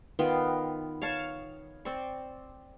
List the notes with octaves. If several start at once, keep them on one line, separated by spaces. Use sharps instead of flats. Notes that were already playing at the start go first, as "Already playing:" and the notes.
D#3 B3 F4 G5
C#5 F5 A5 C#6
C4 D5 C#6